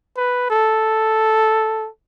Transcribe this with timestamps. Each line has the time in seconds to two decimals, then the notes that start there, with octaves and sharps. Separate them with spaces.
0.17 B4
0.50 A4